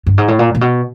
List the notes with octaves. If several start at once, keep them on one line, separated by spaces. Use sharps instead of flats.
G2
G#2
A2
A#2
A#2
B2